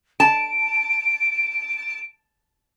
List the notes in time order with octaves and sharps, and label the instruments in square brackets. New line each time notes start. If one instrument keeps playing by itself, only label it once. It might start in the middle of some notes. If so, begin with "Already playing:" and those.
[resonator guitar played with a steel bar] A5 [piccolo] D7